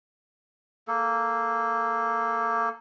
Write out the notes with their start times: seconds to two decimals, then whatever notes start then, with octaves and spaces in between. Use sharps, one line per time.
0.88 A#3 A4